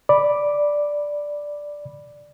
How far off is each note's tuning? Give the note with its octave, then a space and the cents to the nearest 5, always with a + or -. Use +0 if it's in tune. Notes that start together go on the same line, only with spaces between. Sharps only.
D5 +0 B5 -5 D6 +0